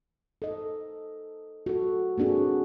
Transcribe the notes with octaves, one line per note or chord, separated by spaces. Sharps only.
A4 D#5
F#4 A4
A#3 C4 D4 F#4 G#4